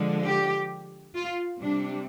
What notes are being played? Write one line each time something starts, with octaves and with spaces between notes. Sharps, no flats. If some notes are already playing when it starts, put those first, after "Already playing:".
Already playing: D3 F3 G#3
G4
F4
C3 G3 D4